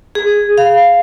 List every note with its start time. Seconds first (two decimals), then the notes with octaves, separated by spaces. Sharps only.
0.15 G#4
0.58 F5